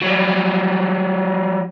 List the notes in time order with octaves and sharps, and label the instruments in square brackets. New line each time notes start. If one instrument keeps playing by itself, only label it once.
[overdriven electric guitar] F#3 G3